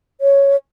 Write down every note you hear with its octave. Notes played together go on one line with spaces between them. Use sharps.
C#5